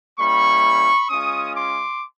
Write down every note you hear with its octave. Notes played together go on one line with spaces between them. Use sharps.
G3 A#3 C#4 E4 B5 C#6
G#3 C#4 F4 C#6 D#6
C6 D6